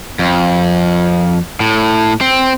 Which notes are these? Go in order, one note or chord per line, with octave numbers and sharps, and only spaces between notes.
F2
A2
C4